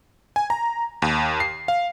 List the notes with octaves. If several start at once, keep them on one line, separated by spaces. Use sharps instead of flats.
G#5
A#5
D#2
C7
F5